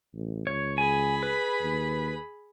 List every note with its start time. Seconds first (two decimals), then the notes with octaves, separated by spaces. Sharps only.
0.13 A1
0.47 C#2 C#5
0.78 G#4 G#5 B5
1.23 B4
1.61 D#2